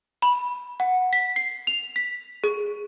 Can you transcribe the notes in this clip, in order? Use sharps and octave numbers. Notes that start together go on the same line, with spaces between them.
B5
F#5
B6
C7
F7
B6
G#4